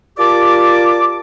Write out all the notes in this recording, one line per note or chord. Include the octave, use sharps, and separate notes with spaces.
F4 G4 A#4 D5 A5 D6